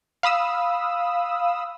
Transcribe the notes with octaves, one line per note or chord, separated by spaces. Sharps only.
F5 B5 D#6 E6